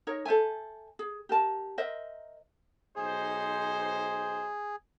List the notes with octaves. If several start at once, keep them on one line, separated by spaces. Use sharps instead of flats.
D#4 A#4 C#5
A4 C5 E5 G#5
G#4
G4 A#4 A5
A#4 C5 D#5 E5
B1 D#4 G#4 C5